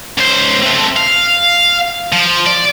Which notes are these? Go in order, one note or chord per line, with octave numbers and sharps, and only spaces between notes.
C#2 C5
A3 C4
F5
F3
D5